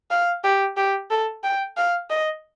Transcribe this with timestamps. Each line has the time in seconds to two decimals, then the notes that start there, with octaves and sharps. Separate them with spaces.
0.11 F5
0.44 G4
0.77 G4
1.10 A4
1.44 G5
1.77 F5
2.10 D#5